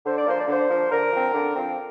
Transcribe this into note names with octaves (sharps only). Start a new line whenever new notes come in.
D3 C5
D5
F3 A#3 C5
D5
D3 C5
F3 A#3
D3 A#4
F3 C4
D3
F3 C4